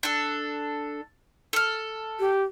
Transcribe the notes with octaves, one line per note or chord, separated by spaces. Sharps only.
D4 A4
A4 F6
G4